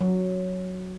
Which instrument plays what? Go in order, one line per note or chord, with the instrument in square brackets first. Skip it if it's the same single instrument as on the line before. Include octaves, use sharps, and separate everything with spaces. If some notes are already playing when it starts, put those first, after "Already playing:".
[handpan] F#3